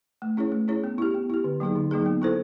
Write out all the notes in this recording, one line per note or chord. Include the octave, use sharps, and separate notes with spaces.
A3
C#4 E4 G#4 C#5
A3
C#4 E4 G#4 C#5
B3
E4 G4
B3
E4 G4
D3
F#3 A#3 D#4 G#4
D3
F#3 A#3 D#4 G#4
B3
E4 A4 C5